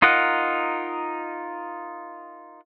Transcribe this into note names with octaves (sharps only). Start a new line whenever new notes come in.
D#4 F4 A#4 D#5 F#5